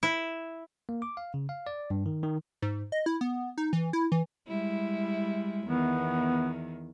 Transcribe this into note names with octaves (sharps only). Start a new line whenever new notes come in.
E4
A#3
D6
F5
C#3
F5
D5
G2
D#3
D#3
G#2
D#5
E4
B3
D#4
E3
E4
E3
G3 G#3 E4
E2 D#3 B3